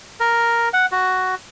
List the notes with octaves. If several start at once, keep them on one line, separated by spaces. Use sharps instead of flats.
A#4
F#5
F#4